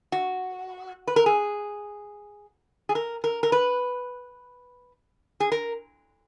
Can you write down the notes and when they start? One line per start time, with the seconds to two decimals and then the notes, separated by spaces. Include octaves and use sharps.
0.12 F#4
1.07 B4
1.16 A#4
1.26 G#4
2.89 G#4
2.95 A#4
3.24 A#4
3.43 A#4
3.52 B4
5.40 G#4
5.52 A#4